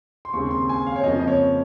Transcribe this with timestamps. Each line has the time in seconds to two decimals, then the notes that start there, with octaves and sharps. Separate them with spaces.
0.25 C6
0.33 D#2 C#3 G#3 C4 C#6
0.51 C6
0.69 G#5
0.87 F5
0.96 C#5
1.04 F2 C#3 F3 A#3 D#5
1.20 D#5
1.28 C#5